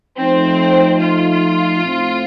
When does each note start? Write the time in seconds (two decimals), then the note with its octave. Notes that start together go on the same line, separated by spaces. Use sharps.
0.18 F3 A3 C4 D#4 C5
1.00 F4
1.83 A2 A3 C4